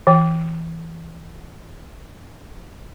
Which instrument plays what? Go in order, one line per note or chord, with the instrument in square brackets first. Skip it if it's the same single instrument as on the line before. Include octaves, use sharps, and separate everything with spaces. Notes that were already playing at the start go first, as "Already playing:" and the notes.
[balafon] E3 G5